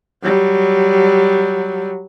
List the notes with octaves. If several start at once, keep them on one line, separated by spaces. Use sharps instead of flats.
F#3 G3